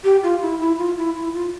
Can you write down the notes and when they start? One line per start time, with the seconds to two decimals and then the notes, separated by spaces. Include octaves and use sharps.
0.04 G4
0.22 F4
0.41 E4
0.59 E4
0.78 F4
0.97 E4
1.15 E4
1.34 F4